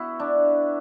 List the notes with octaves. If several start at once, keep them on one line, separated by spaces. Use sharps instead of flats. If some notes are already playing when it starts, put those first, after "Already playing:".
Already playing: B3 E4 F#4
D4